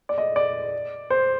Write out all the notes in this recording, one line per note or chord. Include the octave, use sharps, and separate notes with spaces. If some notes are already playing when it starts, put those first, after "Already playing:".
D5
D#5
D5
C5